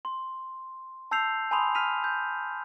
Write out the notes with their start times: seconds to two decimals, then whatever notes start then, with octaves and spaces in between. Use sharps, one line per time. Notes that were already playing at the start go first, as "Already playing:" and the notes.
0.05 C6
1.11 A5 E6 G6 C7 F7
1.51 G#5 A5 B5 C6 D#6 F7
1.75 F6 B6 D#7 F7
2.04 G6